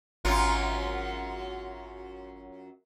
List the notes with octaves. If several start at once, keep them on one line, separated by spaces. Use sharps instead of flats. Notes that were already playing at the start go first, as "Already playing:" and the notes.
G#1 F#2 F#3 F4